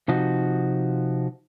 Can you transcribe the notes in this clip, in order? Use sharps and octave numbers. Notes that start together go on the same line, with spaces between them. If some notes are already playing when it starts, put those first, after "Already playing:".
C3 F3 D#4 F#4